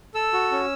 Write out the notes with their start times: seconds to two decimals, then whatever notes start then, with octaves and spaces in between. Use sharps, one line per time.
0.15 A4 E6
0.33 F#4
0.52 C#4